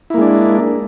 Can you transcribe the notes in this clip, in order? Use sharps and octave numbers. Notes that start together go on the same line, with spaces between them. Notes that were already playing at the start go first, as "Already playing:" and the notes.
G#3 A#3 D4 E4